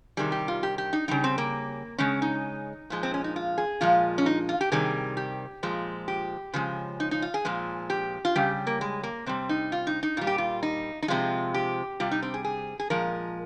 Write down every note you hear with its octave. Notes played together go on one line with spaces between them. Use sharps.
C3 D#3 G3 G#4
G4
F4
G4
G4
D#4
C#3 G3 D#4
C4
A#3
C#3 G#3 C#4
D#4
A#2 F3 G#3
C4
C#4
D#4
F4
G#4
A#2 F3 G#3 F4
C#4
D#4
F4
G4
C3 D#3 G3 G#4
G4
A#2 F3 G#3
G4
C#3 F3 G#3
D#4
D#4
F4
G#4
A#2 F3 G#3
G4
F4
C#3 G3 G4
A#3
G#3
A#3
C3 G3 C4
D#4
F4
D#4
D#4
A#2 G3 F4
G4
F4
D#4
D#4
C3 F3 G#3 F4
G4
C3 G3 F4
D#4
C4
G#4
G#4
G#4
A#2 F3 G#3 A#4